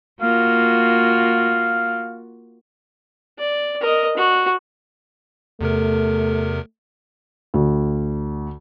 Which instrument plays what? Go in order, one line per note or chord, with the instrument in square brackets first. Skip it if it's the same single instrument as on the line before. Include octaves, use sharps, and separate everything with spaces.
[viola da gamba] A#3 F4 F#4 [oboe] F5
[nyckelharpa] D5
A#4 D#5
F#4
[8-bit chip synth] E2 C3 A#4 [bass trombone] A3
[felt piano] D2